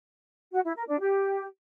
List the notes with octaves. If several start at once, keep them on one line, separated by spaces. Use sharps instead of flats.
F#4
E4
A#4
D4
G4